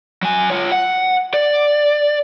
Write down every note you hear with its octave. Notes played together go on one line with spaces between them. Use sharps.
F#3 G#5
F4 C#5
F#5
D5